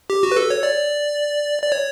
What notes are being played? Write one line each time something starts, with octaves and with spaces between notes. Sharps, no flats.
G4
F#4
B4
A4
C#5
D5
D5
C#5